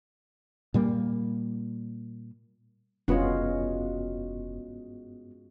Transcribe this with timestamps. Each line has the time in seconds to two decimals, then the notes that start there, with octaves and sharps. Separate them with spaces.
0.74 A#2 G3 A#3
3.08 F1 G2 G#3 B3 C#4 F4 F#4